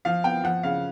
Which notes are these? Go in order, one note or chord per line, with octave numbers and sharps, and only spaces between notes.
F3 F5
B3 G5
F3 F#5
C#3 F5